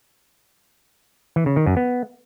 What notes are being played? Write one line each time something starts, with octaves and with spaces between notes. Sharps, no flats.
E3
C#3
D#3
F#2
B3